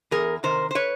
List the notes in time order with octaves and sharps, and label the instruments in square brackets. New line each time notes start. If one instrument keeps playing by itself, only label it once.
[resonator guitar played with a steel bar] E2 G#4 A#4
C3 D#3 A#4 C5
C5
B4 C#5